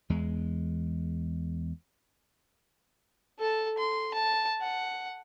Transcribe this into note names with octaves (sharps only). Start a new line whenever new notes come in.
E2 G#3
A4 A5
C6
A5
F#5